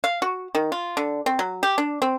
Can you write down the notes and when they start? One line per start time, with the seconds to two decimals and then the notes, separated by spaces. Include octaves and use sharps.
0.04 F5
0.22 F#4
0.55 D#3
0.72 F4
0.97 D3
1.26 C4
1.39 F#3
1.63 G4
1.78 D4
2.02 C4